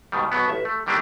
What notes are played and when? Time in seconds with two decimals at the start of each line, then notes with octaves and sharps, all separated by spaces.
0.12 G#2 B2 D#3 G3
0.32 B2 F#3 B3
0.48 A1 E5
0.65 A3
0.86 D3 D#3 G3 A3 A#3 D4